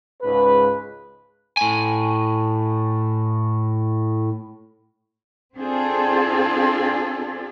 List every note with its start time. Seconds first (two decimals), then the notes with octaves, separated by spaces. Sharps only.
0.23 C#2 G#2 B4
1.57 A2 G#5
5.55 C4 D4 F4 G#4 A4